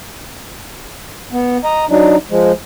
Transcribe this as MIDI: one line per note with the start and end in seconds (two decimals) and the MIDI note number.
1.32 1.57 59
1.64 1.85 75
1.64 1.85 82
1.90 2.16 54
1.90 2.16 62
1.90 2.16 63
2.31 2.52 53
2.31 2.52 56